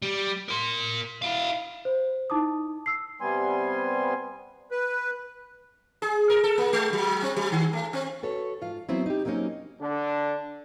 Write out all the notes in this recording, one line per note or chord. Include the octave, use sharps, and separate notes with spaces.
G3
A#4 C6
E4 F5
C5
D#4 E4 A5 D6 D#6
E6 C7
C3 G3 B3 G#5 C6
B4
G#4
A#4
A4
A#3
G#3
F#3
C4
F#3
D#3
A3
C4
F#4 A4 B4 C#5
G#2 F4 F5
F#3 B3 C4 E4 C5
D#4 G4
F#3 A#3 C4 C#4 D#4
D3 D4